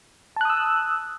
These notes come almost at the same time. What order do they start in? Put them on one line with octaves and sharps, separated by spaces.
A5 F#6 D#6 E6